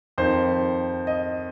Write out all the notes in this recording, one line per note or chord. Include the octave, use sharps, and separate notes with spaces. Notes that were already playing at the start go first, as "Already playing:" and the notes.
F2 D#3 C5
D#5